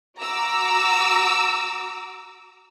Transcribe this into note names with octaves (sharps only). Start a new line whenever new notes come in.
F#4 A#5 D6 E6